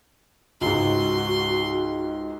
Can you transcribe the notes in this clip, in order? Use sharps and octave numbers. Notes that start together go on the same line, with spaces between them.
C#2 G#2 F#4 C6